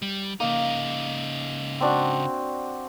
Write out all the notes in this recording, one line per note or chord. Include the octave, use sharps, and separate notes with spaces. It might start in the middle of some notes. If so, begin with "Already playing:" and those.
G3
C#3 A#3 D#4
C4 D4 F#4